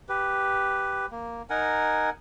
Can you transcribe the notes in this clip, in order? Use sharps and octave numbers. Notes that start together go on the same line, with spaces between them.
G4 B4
A#3
D#4 A#4 F#5 G#5